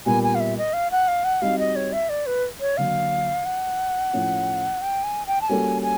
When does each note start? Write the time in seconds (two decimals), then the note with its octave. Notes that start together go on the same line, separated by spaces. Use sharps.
0.06 A#2 G3 B3 G#5
0.23 G#5
0.35 F5
0.40 E5
0.57 D#5
0.73 F5
0.91 F#5
1.08 F5
1.24 F#5
1.42 G3 C4 D#4 F#4 F5
1.59 D#5
1.76 C#5
1.93 E5
2.09 D5
2.26 B4
2.60 C#5
2.77 D3 F#3 A#3 F5
3.45 F#5
4.13 A2 F3 A3 C#4 F4
4.82 G5
5.04 G#5
5.27 G5
5.41 A5
5.49 G3 A#3 C#4 F#4 A4 G#5
5.83 G#5